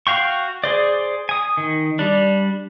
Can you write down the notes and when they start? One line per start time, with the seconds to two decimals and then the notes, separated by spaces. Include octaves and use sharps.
0.07 F#4 F5 G5 C#6
0.64 G#4 C5 D5
1.29 G#5 D#6
1.57 D#3
1.99 G3 D4